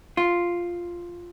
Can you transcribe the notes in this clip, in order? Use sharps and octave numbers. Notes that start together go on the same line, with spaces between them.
F4